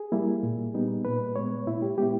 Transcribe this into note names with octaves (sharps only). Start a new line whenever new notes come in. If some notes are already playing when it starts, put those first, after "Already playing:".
Already playing: G#4
G3 A#3 E4
A#2
G3 B3 D#4
A#2 B4
G#3 B3 C#5
A#2 E4
G4
G#3 B3 E4 G4